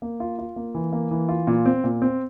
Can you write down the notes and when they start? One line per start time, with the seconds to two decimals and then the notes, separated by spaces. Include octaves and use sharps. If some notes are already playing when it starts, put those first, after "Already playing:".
0.02 A#3
0.20 F4
0.39 F4
0.56 A#3
0.75 E3
0.93 A#3
1.11 E3
1.29 F4
1.47 A#2
1.65 C4
1.84 A#2
2.02 C4